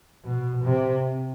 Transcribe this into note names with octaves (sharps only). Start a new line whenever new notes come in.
B2
C3